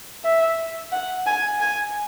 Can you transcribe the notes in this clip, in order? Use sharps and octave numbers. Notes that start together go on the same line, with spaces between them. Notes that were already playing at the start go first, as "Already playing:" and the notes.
E5
F#5
G#5
G#5